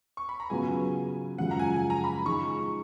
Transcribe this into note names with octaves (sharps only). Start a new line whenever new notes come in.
C#6
B5
A#5
C#3 F#3 B3 F4 G#4 G#5
F#2 C#3 F3 G#3 F#5
A#5
G#5
G#5
A#5
B5
F3 G#3 D#4 G#4 C#6